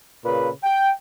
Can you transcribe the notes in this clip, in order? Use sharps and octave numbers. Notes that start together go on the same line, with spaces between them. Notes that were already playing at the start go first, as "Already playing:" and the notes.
A#2 C#3 B4
G5